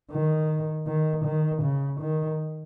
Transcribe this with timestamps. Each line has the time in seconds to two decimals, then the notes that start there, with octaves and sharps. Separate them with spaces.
0.11 D#3
0.87 D#3
1.25 D#3
1.62 C#3
2.00 D#3